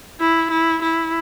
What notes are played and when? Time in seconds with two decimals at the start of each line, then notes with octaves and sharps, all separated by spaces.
0.20 E4
0.51 E4
0.82 E4